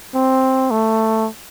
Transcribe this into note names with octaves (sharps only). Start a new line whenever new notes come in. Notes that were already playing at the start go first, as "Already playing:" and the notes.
C4
A3